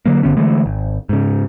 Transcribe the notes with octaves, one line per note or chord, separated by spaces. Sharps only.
D3 F#3 A#3
G1 D3 B3 C#4
D3 E3 G#3 A3
G#1
G#2 C#3